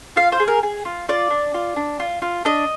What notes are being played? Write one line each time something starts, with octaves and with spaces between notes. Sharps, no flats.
F4 F5
C5
G#4
A#4
G#4
F4
F4 D5
D4
F4
D4
F4
F4
D4 D#5